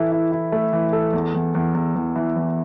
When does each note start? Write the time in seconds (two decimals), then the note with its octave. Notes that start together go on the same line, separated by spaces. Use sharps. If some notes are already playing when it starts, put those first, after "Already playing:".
Already playing: E3 E4 A4
0.12 E4
0.32 E4
0.52 A3
0.73 E3
0.93 A4
1.13 E2
1.34 E2
1.55 E2
1.75 E2
1.95 E2
2.16 E3
2.36 E2